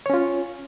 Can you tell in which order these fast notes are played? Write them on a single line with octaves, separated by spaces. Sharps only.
C#5 C#4 F4